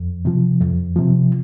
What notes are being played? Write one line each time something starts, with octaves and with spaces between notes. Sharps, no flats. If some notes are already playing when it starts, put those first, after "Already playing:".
Already playing: F2
C3 F3
F2
C3 F3